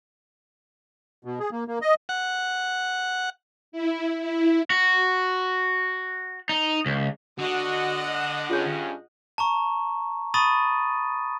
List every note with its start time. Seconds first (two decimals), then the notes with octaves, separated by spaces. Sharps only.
1.25 B2
1.40 G#4
1.52 A#3
1.68 A#3
1.82 D#5
2.09 F#5
3.72 E4
4.21 E4
4.70 F#4
6.49 D#4
6.86 C#2
7.39 D3 F#4 D#5 F#5
8.50 G2 C#4 F4 G#4 G6
9.38 A5 A#5 C#6
10.34 A5 B5 C#6 D#6 A6 D#7